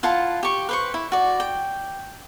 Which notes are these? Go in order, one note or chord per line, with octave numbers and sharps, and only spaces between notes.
E4 F4 F#5 A5
G4 C#6
B4 C5 C#6
E4
F#4 D5
G5